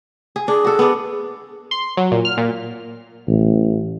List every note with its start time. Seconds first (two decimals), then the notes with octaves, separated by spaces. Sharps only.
0.36 G#4
0.48 D4 G#4
0.65 F#4 A4
0.79 B3 D4
1.71 C6
1.97 F#3
2.12 A#2
2.25 F6
2.38 A#2
3.28 A1